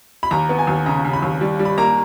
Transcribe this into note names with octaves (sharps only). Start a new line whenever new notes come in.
B5
D#2 A#5
B3
G#5
D#2
C#3 A#5
C#3
B5
D#2
G3
G3
B5
A#3 A#5